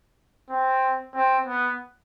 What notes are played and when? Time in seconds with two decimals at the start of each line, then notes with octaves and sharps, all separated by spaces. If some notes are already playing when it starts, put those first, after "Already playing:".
0.49 C4
1.14 C4
1.46 B3